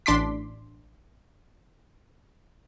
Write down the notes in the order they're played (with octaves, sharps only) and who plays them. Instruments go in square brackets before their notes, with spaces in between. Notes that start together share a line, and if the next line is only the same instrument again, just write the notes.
[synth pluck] A1 D4 C6 D6 B6